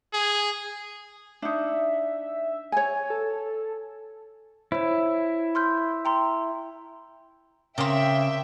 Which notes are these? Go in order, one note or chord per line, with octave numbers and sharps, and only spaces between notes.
G#4
D4 D#4 E5
C#5 G#5
A4
E4 C5 C#5
C6 F6 G6
G5 A#5 C6
C#3 A#3 C4 E5 G5